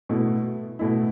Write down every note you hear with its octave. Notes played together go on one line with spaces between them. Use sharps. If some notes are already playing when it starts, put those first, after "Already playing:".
B2 A3 E4
B2 A3 E4